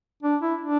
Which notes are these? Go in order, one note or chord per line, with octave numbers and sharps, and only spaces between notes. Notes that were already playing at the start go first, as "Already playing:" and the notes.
D4
E4
D4